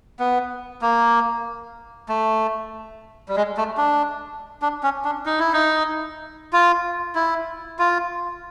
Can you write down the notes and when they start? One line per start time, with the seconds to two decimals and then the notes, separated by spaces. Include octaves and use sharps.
0.19 B3
0.82 A#3
2.09 A3
3.29 G3
3.36 G#3
3.57 A3
3.77 D4
4.62 D4
4.83 C#4
5.05 D4
5.26 D#4
5.39 E4
5.53 D#4
6.53 F4
7.15 E4
7.79 F4